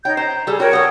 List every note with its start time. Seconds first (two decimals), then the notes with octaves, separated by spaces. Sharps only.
0.05 D#4 C#5 G5 G6
0.17 C5 A#5
0.47 G3 G#4 A4
0.60 F#4 A#4 C#5 G5
0.73 A4 F#5 D#6